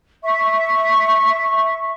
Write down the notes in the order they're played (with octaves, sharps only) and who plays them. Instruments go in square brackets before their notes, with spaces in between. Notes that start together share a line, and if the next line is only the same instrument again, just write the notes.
[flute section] E5 C#6